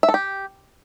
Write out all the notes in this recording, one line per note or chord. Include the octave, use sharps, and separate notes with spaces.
E5
A4
G4